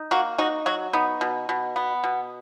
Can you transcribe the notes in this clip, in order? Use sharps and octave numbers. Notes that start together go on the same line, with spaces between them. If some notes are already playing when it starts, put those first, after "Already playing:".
Already playing: D#4
A#3 F#4
D#4 F#4
F#3 F#4
B3 D#4
B2
B2
B3
B2